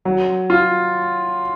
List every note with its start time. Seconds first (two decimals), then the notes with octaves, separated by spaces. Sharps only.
0.05 F#3
0.50 F4